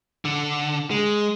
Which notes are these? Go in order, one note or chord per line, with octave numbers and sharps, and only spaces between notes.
D3
G#3